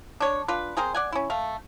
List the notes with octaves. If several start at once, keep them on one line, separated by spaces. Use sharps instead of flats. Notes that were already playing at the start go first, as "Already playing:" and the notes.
D4 C#5
D4 F4 B4
C4 G#4 A#4 C5
D5 F#5 G#5
C#4 E4
A3 F5